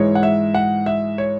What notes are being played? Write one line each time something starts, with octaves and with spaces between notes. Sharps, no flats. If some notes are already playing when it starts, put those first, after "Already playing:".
Already playing: G#2 E3 G#3 E4 C#5
F#5
E5
F#5
E5
C#5